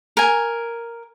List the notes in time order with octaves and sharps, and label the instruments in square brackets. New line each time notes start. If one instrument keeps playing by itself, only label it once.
[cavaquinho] A#4 G#5